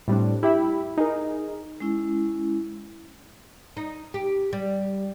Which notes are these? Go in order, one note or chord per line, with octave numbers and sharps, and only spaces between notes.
A2 G3 C4 D4
E4 G4 E5 B5
D#4 G#4 A#4
G#3 C#4 E4
D#4
G4
G3